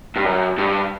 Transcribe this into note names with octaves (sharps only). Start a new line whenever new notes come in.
G2
F#2
G2